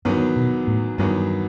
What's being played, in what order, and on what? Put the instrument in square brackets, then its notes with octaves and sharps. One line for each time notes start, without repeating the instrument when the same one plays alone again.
[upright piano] E2 D#3 F#3 B3 [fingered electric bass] G2
[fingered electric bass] B2
A2
[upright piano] E2 D#3 F#3 B3 [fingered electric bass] G2